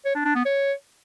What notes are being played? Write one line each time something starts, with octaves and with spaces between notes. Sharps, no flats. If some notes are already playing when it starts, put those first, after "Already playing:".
C#5
D4
D4
B3
C#5